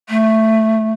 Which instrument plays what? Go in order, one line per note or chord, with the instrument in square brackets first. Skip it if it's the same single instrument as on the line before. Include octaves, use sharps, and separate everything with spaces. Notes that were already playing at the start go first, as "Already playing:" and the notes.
[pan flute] A3